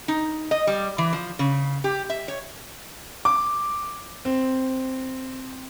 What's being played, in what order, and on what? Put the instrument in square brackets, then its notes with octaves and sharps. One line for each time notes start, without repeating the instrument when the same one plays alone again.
[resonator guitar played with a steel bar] D#4
D#5
G3
E3
F3
C#3
G4
E5
C#5
[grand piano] D6
C4